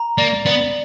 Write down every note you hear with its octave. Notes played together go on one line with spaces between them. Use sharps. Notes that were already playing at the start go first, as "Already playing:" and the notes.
Already playing: A#5
A#3 D5
B3 D5